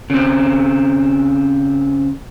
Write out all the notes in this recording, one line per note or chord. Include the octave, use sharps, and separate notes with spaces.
C#3 C4